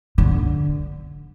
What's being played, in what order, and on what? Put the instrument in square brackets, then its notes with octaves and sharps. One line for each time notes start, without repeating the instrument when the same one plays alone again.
[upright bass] D3